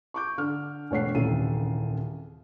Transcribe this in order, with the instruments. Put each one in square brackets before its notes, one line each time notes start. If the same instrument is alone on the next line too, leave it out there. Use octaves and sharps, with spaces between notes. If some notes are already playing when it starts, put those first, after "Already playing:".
[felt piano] C#6 D6 G6
D3 A4 F6
E1 A3 C#5 F#5 C7
D#1 C2 C#3 E3 A4 D#7